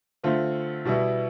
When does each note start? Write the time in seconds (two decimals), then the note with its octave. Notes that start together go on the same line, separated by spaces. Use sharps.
0.23 D3 A3 C4 F4
0.85 B2 G3 B3 E4